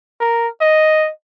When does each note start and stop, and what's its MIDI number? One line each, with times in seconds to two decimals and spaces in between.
0.21 0.48 70
0.61 1.10 75